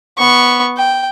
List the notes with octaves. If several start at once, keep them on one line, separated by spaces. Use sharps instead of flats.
B3 C#6
G5